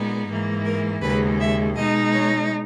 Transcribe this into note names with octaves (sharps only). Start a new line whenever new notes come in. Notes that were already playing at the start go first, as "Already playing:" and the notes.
Already playing: A#2 G#3 B3 D#4
G#2 E3 A#3
A#4
D#2 C#3 G#3 B4
E5
B2 G#3 D#4 D#5
C#5